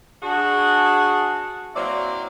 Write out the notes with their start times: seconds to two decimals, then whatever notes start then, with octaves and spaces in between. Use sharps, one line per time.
0.23 D4 F#4 G#4
1.75 F#3 A#3 C4 E4 C5 D5